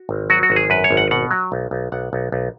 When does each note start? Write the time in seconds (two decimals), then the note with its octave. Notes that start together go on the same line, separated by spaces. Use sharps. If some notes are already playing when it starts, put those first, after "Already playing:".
Already playing: F#4
0.09 G#1
0.30 F#3 F#4
0.43 F#4
0.50 G#1
0.56 G#4
0.70 F#2 B4
0.84 C#5
0.91 G#1
0.97 F#5
1.11 B2 F#5
1.31 F#3
1.52 B1
1.71 B1
1.92 B1 F#5
2.13 B1
2.32 B1